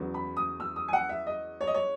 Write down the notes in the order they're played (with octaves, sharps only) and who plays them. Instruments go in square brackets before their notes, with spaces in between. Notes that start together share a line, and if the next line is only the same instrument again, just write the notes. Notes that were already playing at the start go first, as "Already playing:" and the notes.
Already playing: [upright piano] E2 C#3 F#3
B5
D#6
E6
D#6
G#5
F#5
E5
D#5
C#5
D#5
C#5